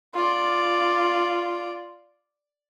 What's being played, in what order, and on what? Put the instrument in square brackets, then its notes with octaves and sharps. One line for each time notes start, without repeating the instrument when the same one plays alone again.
[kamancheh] F4 D5